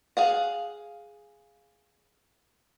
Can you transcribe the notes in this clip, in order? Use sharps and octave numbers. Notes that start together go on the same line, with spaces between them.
G#4 F5 F#5